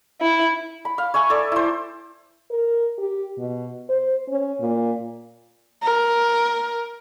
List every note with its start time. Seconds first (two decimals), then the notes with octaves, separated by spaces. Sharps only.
0.21 E4
0.85 B5
0.98 F5
1.14 C#5 E5 G#5 C#6
1.30 A4 D5
1.52 E4 C5
2.50 A#4
2.98 G4
3.38 B2
3.89 C5
4.29 C#4
4.60 A#2
5.83 A#4